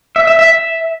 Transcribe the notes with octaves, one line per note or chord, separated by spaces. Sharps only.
E5
E5
E5